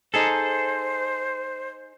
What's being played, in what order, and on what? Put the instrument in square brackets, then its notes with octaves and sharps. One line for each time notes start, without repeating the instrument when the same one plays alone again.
[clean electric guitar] D#4 G#4 A4 [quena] C5